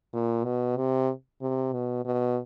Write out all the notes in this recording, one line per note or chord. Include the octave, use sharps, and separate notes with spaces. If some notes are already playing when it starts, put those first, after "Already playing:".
A#2
B2
C3
C3
B2
B2